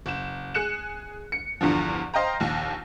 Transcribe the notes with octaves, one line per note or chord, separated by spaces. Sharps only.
F#1 E7
G#4 F#6 C#7 E7
C#7
E2 G2 D3 F3
C5 D#5 F5 G5 A#5
A#1 D#2